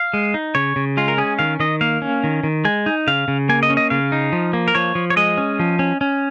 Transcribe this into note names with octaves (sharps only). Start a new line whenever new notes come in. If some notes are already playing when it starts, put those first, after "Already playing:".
Already playing: F5
G#3
D#4
C#3 C#5
C#3
G#3 F4
A#4
C#4 G#4
D#3 F5
D#3 D#5
A#3 F5
C#4
D#3
D#3
G#3 G#5
D#4
C#3 F5
C#3
A#3 G#5
D#5
C#4
D#5
C#3 F5
D#4
F3
A#3
A#4
F3 C#5
F3
C#5
G#3 D#5
C#4
F3
C#4
C#4